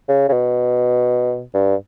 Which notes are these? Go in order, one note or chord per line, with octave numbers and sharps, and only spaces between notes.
C#3
C#3
B2
G2